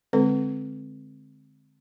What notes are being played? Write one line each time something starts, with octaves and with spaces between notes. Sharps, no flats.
D3 G#3 C4 A4 B4